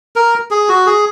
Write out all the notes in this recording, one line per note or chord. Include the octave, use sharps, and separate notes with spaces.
A#4
G#4
F#4
G#4